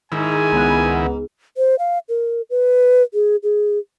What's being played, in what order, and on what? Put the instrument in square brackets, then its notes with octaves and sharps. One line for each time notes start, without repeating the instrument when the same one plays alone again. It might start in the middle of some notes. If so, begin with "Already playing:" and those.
[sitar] G#2 [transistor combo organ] D#3 E4 [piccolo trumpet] G#5
[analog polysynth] C#2 B3
[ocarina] C5
F5
A#4
B4
G#4
G#4